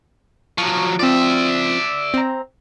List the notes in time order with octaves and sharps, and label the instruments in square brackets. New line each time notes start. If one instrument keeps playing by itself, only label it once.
[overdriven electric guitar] F3 F#3 [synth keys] C#6
[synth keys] F3 C4 [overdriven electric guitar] D5 E5
[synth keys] C4 A#5